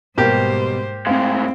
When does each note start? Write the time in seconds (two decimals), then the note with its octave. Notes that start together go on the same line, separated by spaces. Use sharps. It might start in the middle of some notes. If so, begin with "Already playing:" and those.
0.18 G#2 B2 G3 A#3 G4 C5
1.07 A2 G#3 C4 F5